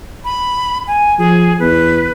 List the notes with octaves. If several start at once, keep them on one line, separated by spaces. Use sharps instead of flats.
B5
G#5
F3 G#4
E2 B4